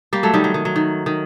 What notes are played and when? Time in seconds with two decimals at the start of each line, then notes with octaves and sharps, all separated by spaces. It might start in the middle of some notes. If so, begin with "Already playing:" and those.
0.13 G3 A#3
0.23 F#3 A3
0.34 D#3 G3
0.44 F#3
0.54 D#3
0.65 F#3
0.76 D#3
1.06 D#3